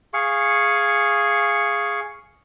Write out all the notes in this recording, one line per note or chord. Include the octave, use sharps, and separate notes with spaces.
G#4 F5 C#6